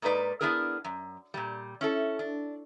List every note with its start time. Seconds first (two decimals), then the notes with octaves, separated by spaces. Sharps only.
0.02 G#2 A#3 D#4 B4 D5
0.41 B3 D4 E4 G#4 A#4
0.84 F#2
1.34 A#2 G3
1.81 C#4 E4 A4
2.19 D4